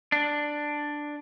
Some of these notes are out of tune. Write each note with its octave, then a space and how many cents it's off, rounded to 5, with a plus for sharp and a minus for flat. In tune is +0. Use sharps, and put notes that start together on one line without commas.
D4 +5